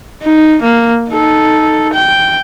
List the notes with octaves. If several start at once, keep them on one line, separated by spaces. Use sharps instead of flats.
D#4
A#3
D#4 A4
G5